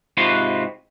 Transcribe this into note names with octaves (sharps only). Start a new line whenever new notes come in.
G#2 C3 F4 F#4 B4 C6